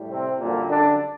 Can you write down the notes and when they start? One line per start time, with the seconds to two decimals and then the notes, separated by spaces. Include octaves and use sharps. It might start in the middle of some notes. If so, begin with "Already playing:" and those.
Already playing: A2 G3
0.10 C3 C4
0.39 F#2 A#2 D3 G3 A#3
0.68 D3 D4